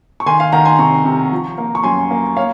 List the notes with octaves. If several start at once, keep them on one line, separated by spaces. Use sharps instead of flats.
C#6
D#3 G#5 C6
F5 G#5
D#3 F#5 A#5
G#5 C6
C3 A#5 C#6
C3
F3
A#3
C#6
F#2 G#5 C6
A#3
A#3 C#5 F5